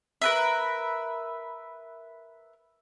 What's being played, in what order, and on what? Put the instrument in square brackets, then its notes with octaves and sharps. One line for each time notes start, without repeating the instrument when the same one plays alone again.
[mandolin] A#4 B4 E5